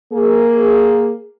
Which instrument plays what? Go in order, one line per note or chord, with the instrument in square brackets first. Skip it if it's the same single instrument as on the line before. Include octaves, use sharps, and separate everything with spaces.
[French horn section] A#3 G#4